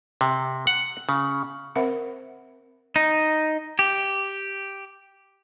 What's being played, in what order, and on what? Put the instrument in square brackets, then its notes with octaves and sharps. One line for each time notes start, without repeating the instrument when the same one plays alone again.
[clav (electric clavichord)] C3
F#5
C#3
[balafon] C4 A#4 C5 E5 F#5 B5
[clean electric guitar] D#4
G4